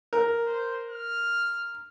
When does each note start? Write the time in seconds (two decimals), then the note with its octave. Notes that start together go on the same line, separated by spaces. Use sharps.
0.13 A#4
0.46 C5
0.91 F6